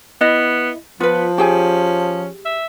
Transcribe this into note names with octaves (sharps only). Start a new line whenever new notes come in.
B3 E4 D#5
F3 B3 F4 B4
C#4 G4 G#4 G#5
E5